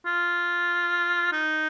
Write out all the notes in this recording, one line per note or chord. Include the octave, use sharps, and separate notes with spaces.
F4
D#4